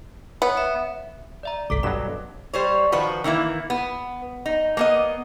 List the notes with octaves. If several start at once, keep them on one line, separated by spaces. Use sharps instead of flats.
B3 C#5
E5
D5 E5 A#5
G1 C2 A4 D6 B6
G2 B2 F#3 E7
G3 C5 C#5
D#3 F3 F#4 B4
D#3 E3 A#3 E4
B3
D#4
A#3 B3 D#5